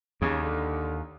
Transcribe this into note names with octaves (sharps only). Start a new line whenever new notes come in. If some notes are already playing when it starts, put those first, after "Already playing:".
D#2 C#3
D3